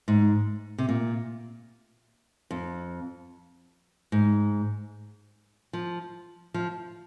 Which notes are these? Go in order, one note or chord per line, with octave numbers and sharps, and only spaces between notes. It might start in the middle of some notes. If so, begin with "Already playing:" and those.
G#2
C3
A#2
F2
G#2
F3
F3